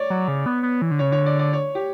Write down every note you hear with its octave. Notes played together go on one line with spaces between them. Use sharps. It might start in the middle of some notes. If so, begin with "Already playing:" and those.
Already playing: C#5 D5
F#3
C#3
B3
B3
E3
D3
C#3 C#5
D3 C#5
D5
D5
C#5
G4